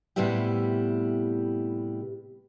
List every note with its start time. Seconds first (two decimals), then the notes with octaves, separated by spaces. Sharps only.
0.16 A2 C3 G3 B3 E4 G4